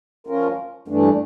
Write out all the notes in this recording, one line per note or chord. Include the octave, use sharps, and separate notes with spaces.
F3 C#4 F4 A#4
G2 E3 A3 D4